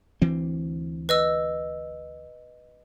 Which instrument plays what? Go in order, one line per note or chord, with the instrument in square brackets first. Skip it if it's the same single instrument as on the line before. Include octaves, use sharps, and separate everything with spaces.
[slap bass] D2 E3 C4
[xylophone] B4 D#5 E6